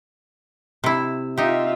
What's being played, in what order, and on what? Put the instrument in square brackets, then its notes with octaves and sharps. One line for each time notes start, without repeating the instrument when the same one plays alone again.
[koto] C3 E4
[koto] D#4 G4 [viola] F4 E5